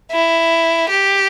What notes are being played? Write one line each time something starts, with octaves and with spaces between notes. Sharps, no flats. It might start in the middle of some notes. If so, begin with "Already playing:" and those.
E4
G4